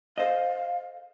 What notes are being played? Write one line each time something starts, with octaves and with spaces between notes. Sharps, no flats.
A4 C5 D#5 F5